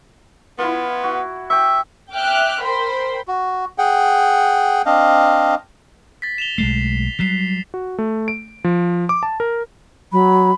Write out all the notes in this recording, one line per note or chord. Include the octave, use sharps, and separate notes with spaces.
B3 E4 F4
F#4
E5 G5 C#6
E5 G5 D6 F6 F#6
A#4 C5 G5 B5 C6
F#4
G#4 F#5 G5
C4 D4 D#5 F5
A6 B6
E7 F7 G7
B1 G#3 A3 C7
F#3 G3 B6 C7
F#4
A3
D7
F3
D6
A5
A#4
F#3 B5